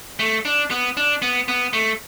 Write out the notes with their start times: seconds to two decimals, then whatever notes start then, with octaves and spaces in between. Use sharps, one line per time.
0.19 A3
0.45 D4
0.71 B3
0.97 D4
1.22 B3
1.48 B3
1.73 A3